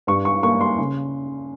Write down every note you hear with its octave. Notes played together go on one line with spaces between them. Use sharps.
G2 C#6
C#6
A#3 C#6
C6
C#3